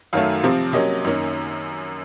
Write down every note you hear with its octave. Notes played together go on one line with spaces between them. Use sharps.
F#2 D#3 F#3 A3 F5
C3 F3 C4
C3 F#3 A#3 C#4 D#5
F#2 D#3 A#3 C#4